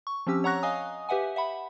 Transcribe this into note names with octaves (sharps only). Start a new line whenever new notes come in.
C#6
F3 C4 C#4 G4 E6
C#5 F#5 A#5 C#6 F#6 A#6
D#5 F5 G#5 D#6
G4 B4 E5 F#5 G#5
E5 F#5 B5